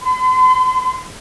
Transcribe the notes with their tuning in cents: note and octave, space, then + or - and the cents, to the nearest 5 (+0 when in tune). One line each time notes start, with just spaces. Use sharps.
C6 -40